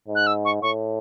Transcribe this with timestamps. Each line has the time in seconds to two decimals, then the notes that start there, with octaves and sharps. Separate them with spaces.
0.09 G#2
0.15 F#6
0.27 E6
0.45 C#6
0.62 A2 C#6